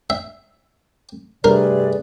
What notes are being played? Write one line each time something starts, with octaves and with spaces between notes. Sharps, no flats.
E5
G2 C3 A3 G#4 A#4 B4 D5